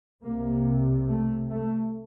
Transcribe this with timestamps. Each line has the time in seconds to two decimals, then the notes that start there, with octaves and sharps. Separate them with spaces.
0.23 C2 C3 A#3
1.08 A3
1.51 A3